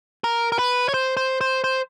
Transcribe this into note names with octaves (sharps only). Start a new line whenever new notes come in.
A#4
A#4
B4
C#5
C5
C5
C5
C5